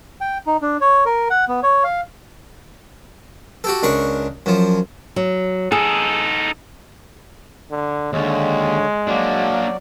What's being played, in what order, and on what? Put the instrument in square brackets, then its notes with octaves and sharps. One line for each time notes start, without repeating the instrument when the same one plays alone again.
[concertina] G5
D#4
D4
C#5
A#4
F#5
B3
C#5
F5
[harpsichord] F#4 G4 A4
C#2 D4 A#4 C#6
F#2 F3
[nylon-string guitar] F#3
[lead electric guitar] D#4 A4 [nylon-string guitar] G#4
[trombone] D3
[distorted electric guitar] D#2 [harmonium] D3 C#5 [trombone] G#3
[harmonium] F#3 F#4 D5 [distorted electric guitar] A#3 D4